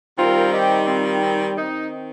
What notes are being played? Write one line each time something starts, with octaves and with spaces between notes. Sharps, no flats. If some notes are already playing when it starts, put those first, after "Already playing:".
D#3 G3 C4 F4 A#4
D#4 G4
C4 F4
C4
D#3 C4 D#4